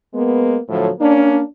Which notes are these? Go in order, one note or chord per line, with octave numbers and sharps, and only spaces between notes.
G#3 A#3 B3
A2 D3 F3 F#3 A4
A#3 C#4 D4